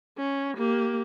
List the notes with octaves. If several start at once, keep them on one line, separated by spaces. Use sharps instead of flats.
C#4
A#3 G4